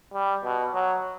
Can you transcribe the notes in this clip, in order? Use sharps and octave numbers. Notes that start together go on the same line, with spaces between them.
G3
B2
F#3